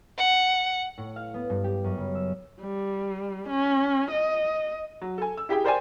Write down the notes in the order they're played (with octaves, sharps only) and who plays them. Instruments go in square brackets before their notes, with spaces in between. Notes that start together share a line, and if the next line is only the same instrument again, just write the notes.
[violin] F#5
[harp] A2
F5
B3
G2
G4
F#2
C#3
E6
[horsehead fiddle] G3
C#4
D#5
[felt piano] F#3
A4 G#5
E6
E4 G4 G#4 G5
A#4 C5 D5 G5 G#5